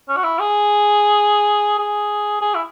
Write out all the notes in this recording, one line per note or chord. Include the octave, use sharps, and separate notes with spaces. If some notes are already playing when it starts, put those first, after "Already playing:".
C#4
F#4
E4
G#4
G#4
G#4
E4